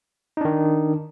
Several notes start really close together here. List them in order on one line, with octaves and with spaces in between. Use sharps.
D#4 D4 D#3